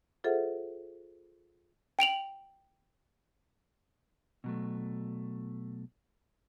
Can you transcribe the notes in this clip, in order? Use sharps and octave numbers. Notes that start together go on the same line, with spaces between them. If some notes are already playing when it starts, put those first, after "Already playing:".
F4 G#4 A4 C5 E5 F#5
G5 D7 F7 F#7
B2 F#3 A3